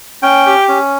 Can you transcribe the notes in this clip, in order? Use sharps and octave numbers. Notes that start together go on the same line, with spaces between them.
C#4 G5
G4
C#4